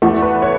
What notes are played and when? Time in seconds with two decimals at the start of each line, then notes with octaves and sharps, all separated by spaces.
0.02 E2 E3 A3 F#5
0.22 B4
0.42 C#5